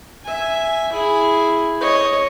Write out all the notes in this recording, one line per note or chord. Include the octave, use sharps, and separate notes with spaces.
E5 G#5
E4 G#4
C#5 D#5